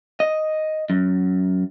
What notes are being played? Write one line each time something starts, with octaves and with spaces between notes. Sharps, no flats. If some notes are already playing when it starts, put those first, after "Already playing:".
D#5
F#2